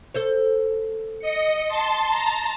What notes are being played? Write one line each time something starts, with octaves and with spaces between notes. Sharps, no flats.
A4 C5 C#5
D#5 C#7
A5 C6
A5 A#5